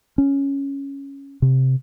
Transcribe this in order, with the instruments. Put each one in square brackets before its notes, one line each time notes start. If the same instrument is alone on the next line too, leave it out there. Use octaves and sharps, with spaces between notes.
[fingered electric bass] C#4
C3